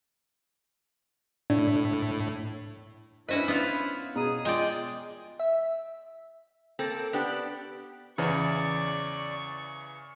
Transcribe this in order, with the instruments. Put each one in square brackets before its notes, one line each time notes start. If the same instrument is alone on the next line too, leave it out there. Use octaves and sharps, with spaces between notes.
[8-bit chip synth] A2 [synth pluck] D4
[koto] C#4 F#4 B4 [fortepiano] D4 C5 D#5 [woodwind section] E4
[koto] B3 F4 F5
[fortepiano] B2 A#5 [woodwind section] G#4 D#6
[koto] G#3 D5 [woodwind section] F4 G5
[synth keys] E5
[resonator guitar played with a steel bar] A#3 C4 A4
B3 D4 G4
[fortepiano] E2 [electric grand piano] C#3 E3 [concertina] D5 [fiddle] C#6